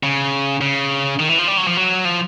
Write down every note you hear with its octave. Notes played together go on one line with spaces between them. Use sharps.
C#3
C#3
D#3
E3
F3
G3
F#3
F3
F#3
F3